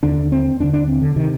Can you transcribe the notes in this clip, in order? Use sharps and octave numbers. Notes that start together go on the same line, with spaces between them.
D#2 D3 D4
C4
D#2 D3 D4
D4
C4
D3
C3 D#3